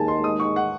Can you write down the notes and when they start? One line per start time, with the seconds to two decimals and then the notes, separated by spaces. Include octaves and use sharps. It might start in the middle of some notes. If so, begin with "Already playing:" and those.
Already playing: D#2 D#3 G#3 G#5 A5
0.08 C6
0.24 D#6
0.40 C#6
0.56 F#5